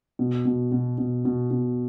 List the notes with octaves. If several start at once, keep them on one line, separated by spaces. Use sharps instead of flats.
B2
B2
B2
B2
B2
B2